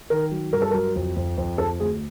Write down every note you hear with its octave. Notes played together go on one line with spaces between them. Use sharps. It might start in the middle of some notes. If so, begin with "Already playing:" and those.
D#3 A#4
F#3
G2 A#4
A4
F#3 A#4
F2
F2
F2
F2 A4
D2 G#4